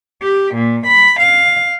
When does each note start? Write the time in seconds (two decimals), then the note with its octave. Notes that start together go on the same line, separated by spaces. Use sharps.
0.22 G4
0.56 A#2
0.86 B5
1.20 F5